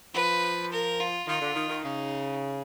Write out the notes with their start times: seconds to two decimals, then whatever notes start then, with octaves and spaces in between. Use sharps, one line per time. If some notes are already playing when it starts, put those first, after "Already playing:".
0.14 F3 B4
0.72 A#4
1.00 F4
1.27 D#3 F4
1.41 D3
1.55 D#3
1.69 D#3
1.84 C#3 D#4